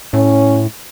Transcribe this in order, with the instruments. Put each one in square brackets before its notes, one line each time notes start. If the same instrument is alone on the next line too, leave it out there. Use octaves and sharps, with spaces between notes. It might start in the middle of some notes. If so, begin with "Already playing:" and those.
[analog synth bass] A2 [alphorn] C#4